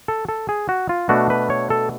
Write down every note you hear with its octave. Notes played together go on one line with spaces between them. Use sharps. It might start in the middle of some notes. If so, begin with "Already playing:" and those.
A4
A4
G#4
F#4
F4
B2 A3 D4 F#4
B4
C#5
A4